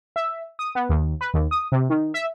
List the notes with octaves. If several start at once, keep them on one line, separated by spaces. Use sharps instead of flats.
E5
D#6
B3
D#2
B4
D#2
D#6
C3
D#3
E5